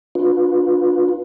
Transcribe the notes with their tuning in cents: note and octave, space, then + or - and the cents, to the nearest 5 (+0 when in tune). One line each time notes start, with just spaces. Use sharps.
D4 +0 F4 +30 B4 +0